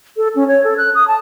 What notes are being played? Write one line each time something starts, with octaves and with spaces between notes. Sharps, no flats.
A4
C#4
C#5
A4
F#6
D#6
A5